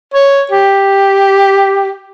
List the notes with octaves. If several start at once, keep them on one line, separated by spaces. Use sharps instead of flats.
C#5
G4